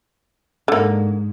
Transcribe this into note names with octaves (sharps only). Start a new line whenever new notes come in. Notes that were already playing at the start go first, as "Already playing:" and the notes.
G#2 D3 A#3